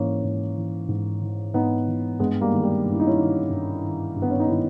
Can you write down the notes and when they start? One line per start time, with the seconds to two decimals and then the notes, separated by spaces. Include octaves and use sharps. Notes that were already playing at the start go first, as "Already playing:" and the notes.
Already playing: G#2 E3 A#3 C#4
0.24 G#2
0.56 E3
0.89 G#2
1.21 E3
1.54 G#2 B3 D#4
1.87 E3
2.20 G2 G#3 B3
2.41 G3 A#3
2.52 D#3
2.63 G3
2.85 G2
2.93 E4
3.00 D#4
3.07 C#4 E4
3.17 D#3
3.50 G2
3.83 D#3
4.16 G2
4.22 B3
4.31 C#4
4.40 D#4
4.48 D#3 C#4 E4